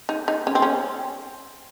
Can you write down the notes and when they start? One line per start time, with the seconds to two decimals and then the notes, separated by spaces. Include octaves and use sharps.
0.09 D#4
0.28 D#4
0.47 C#4
0.55 C4
0.62 C#4